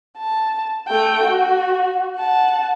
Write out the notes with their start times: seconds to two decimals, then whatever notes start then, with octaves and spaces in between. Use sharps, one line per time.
0.18 A5
0.88 A3 G5
1.24 F#4
2.16 F#5 A5